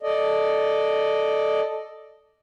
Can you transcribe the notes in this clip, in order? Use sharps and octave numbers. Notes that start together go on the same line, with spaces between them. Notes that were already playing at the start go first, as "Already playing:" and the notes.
A4 D5 D#5